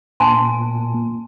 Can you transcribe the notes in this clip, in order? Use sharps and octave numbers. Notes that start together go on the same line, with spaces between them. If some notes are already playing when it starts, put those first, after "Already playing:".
A#2 G#5 A5 C6